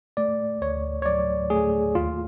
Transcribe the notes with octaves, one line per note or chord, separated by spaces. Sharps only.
A3 D5
D2 C#5
C#5
F#3 D5
A3 G#4
D#2 F4